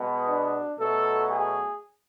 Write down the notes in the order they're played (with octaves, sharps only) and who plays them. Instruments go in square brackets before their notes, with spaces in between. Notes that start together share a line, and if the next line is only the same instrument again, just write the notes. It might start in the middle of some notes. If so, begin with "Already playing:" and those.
Already playing: [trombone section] B2 G#3 B3
D4
B2 F#3 A3 A4
G#4